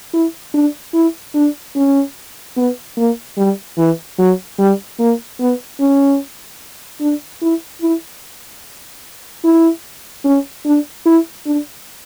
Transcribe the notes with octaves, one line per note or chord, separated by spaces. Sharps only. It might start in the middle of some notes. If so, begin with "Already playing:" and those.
E4
D4
E4
D4
C#4
B3
A#3
G3
E3
F#3
G3
A#3
B3
C#4
D4
E4
E4
E4
C#4
D4
E4
D4